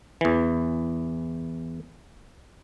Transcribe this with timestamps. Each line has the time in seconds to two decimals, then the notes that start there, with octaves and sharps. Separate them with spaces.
0.21 E2 E3